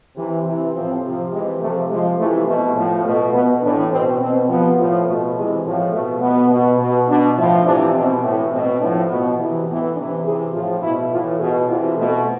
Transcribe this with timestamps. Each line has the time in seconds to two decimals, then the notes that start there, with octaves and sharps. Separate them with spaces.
0.16 C3 E3
0.45 C3 E3
0.74 A2 F3 C4
1.02 C3 F3
1.31 C3 E3 G#3
1.61 C3 F3 A3
1.89 C3 F3 G#3
2.18 C3 E3 A3
2.47 B2 A3
2.76 A2 F3
3.05 B2 A3
3.33 B2 B3
3.62 A2 E3 D4
3.91 B2 C4
4.19 B2 C4
4.49 C3 F3 B3
4.78 A2 F3
5.06 B2 A3
5.35 C3 E3 G#3
5.64 A2 F3
5.92 B2 A3
6.21 B2 B3
6.51 B2
6.79 B2
7.08 B2 D4
7.37 A2 F3 E4
7.65 C3 E3 D4
7.94 B2 C4
8.23 A2 E3 A3
8.51 B2 C4
8.80 A2 D4
8.85 F3
9.09 B2 B3
9.39 C3 E3
9.67 A2 E3 B3
9.96 C3 E3 D4
10.24 C3 E3 G#4
10.53 A2 F3 F4
10.82 B2 E4
11.11 A2 E3 F4
11.40 B2 G#4
11.68 C3 E3 F4
11.97 B2 A3